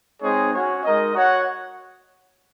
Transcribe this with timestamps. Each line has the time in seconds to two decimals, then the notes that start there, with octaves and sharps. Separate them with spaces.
0.22 G#3 C4 D#4 G#4 C#5
0.54 C#4 F#4 C#5
0.84 G#3 D#4 A#4 D#5
1.14 F#4 C#5 F#5